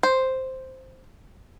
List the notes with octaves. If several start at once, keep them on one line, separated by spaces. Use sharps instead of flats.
C5